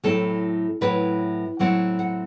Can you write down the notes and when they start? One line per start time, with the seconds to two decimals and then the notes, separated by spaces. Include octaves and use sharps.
0.04 A2 F#3 C4 E4 A4
0.81 A2 F#3 C4 E4 B4
1.59 A2 F#3 C4 E4 F#5
1.99 F#5